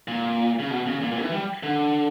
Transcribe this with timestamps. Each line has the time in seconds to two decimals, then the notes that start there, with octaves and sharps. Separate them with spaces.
0.08 A#2
0.59 C#3
0.70 B2
0.86 C#3
1.01 A#2
1.12 A#2
1.22 E3
1.32 G3
1.63 D3